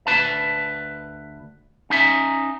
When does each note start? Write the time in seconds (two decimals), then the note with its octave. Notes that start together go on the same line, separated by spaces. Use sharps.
0.07 D2 B4 A5
1.90 C#4 D#4 E5